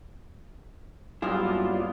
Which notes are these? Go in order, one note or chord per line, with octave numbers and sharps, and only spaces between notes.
G2 F#3 G3 A#3 B3 E4 F4 G#4